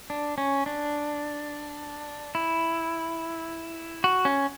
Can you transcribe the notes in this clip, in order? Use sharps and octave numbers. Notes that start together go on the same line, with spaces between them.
D4
C#4
D4
E4
F#4
C#4